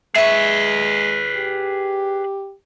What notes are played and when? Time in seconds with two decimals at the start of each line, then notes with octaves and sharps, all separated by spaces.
0.15 G#3 G#4 B4 E5 C#6
1.36 G4